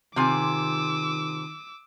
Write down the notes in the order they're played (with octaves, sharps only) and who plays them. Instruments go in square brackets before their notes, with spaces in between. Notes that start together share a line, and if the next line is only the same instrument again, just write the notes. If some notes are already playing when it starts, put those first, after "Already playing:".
[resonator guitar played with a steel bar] C3 F4 G#5 [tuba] D#3 [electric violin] D6 E6